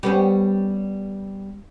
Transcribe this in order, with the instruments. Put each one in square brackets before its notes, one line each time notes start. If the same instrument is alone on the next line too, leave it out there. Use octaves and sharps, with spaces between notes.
[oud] G3 B3 C#4